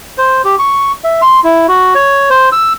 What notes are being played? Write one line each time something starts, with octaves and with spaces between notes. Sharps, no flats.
C5
G4
C#6
E5
C6
E4
F#4
C#5
C5
E6